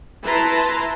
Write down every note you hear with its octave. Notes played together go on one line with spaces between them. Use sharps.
E4 B4 A5 A#5 C6